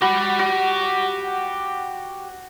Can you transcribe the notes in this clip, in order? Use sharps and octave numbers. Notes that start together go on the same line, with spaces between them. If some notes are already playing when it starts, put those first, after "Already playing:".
F#4 G4 B5
F#4